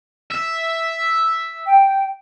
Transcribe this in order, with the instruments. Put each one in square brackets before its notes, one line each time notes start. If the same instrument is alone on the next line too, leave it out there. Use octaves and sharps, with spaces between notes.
[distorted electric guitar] E5
[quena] G5